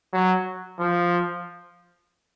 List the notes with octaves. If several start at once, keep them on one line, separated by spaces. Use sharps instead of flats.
F#3
F3